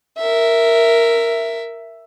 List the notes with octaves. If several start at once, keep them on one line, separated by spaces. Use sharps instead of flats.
A#4 E5